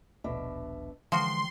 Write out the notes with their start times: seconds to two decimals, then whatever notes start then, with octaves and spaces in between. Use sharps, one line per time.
0.24 D#1 A#1 B2 D4 E5
1.12 D3 E3 F3 G#3 F#4 G5 C6